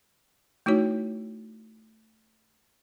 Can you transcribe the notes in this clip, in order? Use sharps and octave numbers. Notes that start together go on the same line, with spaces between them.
A3 D#4 E4 F#4 C#5